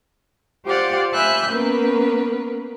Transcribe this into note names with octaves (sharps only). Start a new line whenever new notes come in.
F4 G4 C5 D5 F5 F#5
E5 G#5 B5 E6 F#6 G6
A#3 B3 C#4 A#4 B4